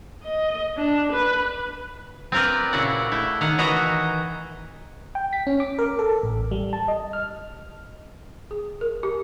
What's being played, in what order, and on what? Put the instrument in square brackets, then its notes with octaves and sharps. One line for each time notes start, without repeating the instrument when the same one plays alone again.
[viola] D#5
D4
B4
[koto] C4 F4 A#4 B4 D5
A#2 C#3 E4 F#4 D5 F#5
A3 E4
D#3 F5 F#5
D#3 E3 E4 F#4 D#5 A#5
[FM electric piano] G5
B6
C#4
D6
A#4
A4
A1
G3
A5
D#5
F6
[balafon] G#4
A#4
G4